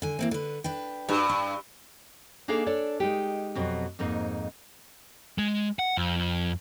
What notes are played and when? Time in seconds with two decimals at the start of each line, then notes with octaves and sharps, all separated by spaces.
0.02 D3 G#5
0.19 E3 A#3 C4
0.31 D3 B4
0.64 D4 B4 G5
1.09 G2 F#4 B4
1.29 D4
2.48 A#3 D4 D#4 G#4 A4 F5
2.66 D4 A4 C#5 D5
3.00 G#3 D#4 G4
3.55 F2 B2 F#3
3.99 F2 G#2 A#3 D#4
5.38 G#3
5.79 F#5
5.97 F2